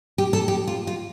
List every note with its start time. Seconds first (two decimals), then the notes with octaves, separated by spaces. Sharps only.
0.18 G4
0.33 A4
0.48 G4
0.67 F4
0.87 F4